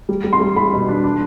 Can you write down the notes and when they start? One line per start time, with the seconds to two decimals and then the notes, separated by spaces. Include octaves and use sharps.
0.09 G3
0.24 G3
0.33 C6
0.41 G3
0.56 G3 B5
0.73 B2
0.88 D4
1.04 D4